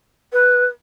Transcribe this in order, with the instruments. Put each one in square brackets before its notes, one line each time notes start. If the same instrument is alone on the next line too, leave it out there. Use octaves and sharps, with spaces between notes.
[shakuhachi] B4